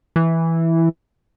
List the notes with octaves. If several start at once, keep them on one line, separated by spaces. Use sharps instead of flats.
E3